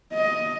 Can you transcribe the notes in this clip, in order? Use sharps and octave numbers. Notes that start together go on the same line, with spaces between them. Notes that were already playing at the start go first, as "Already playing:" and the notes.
D#5